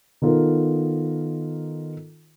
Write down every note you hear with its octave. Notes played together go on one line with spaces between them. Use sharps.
D#3 B3 D#4 F4 A4 A#4